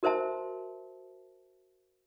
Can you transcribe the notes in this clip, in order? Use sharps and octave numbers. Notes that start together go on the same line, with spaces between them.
F#4 A#4 C5 E5 A5